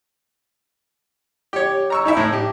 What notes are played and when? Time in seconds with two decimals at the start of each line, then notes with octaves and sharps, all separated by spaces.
1.53 G4 C#5
1.90 A#5 C#6 E6
2.05 D#4 E4 E5
2.17 A2
2.33 G4